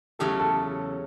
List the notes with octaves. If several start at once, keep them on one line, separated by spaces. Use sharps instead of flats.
E2 C#3 F#3 A3 G4 A4
G4 A4